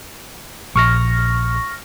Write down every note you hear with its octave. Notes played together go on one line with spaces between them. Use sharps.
A#1 C#6 F6 A#6